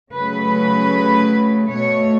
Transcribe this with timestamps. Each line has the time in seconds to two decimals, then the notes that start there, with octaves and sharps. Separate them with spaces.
0.14 C#3 F#3 A3 B4
1.68 B2 A3 C#5